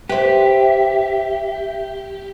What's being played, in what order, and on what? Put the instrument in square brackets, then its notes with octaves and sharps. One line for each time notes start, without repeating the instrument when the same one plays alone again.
[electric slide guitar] G4 [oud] B4 C5 [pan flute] E5